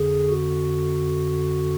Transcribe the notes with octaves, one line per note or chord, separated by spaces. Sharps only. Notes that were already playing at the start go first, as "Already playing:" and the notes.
Already playing: F2 D3 G#4
F#4